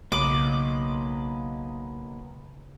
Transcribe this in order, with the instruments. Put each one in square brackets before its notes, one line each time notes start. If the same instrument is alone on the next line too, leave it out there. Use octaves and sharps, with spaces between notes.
[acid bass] B1 [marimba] C#3 [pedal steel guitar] A#3 D#5 B5 [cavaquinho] D6